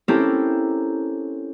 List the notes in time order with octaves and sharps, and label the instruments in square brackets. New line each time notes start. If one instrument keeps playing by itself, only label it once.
[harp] C4 C#4 E4 G4 A4 A#4